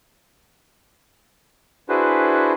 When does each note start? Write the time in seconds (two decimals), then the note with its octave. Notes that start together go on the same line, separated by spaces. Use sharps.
1.89 D4 E4 F#4 G#4 B4 C5